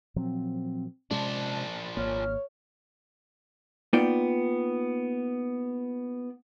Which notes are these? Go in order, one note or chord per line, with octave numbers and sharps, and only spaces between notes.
A#2 F3 F#3 C4
C3 F3 G#3 C#4 D4 A5
G#1 A#3 C#5 F6
A#3 B3 D#4 F4 D5 G5